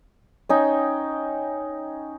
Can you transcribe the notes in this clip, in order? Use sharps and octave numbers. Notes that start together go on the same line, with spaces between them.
C#4 D#4 G5